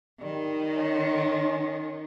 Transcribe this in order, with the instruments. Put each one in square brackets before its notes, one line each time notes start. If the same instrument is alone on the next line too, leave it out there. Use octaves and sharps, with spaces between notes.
[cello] D#3 [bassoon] G3
[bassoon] C#4